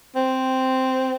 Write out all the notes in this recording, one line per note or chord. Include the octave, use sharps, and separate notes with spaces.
C4